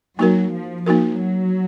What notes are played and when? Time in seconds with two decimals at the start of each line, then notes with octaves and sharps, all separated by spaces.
0.19 F#3 A#3 D#4 F#4 A#4
0.52 F3
0.86 F3 A#3 D#4 F#4 A#4
1.20 F#3